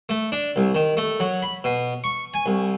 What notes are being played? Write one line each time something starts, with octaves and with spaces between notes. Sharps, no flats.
A3
D4
C2
D#3
A3
F#3
B5
B2
C#6
G#5
C2